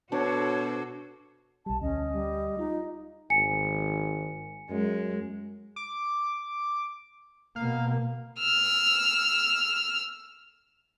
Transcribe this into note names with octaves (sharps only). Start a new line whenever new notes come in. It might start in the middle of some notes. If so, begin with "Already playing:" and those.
B2 D4 F#4 A4 C5 C#5
B1 G3 A5
D2 C#4 D#5
G3
D#4 F4
G#1 G#5 C#7
F#2 G#3
D6
B2 A#3 F5
E6 F6